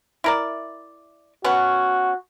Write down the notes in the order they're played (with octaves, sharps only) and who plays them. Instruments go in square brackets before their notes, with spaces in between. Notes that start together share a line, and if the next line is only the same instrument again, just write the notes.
[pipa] E4 A#4 D5
[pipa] B3 C#4 F#5 [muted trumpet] F#4